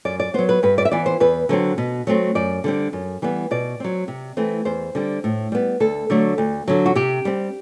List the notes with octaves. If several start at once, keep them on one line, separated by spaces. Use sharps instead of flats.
F#2 D5
D5
F#3 B3 C5
B4
G2 B4
D5
E5
E3 B3 D5
C5
E2 B4
D3 F#3 C4
B2
F#3 A3 C4
F#2 D5
D3 G3 C4
F#2
E3 G3 B3
B2 D5
F#3 C4
C3
E3 A3 C4
E2 C5
D3 G3 C4
A2
G3 B3
D2 A4
D3 F#3 A3
D2
D3 F#3
F#4
C3 G4
G3 C4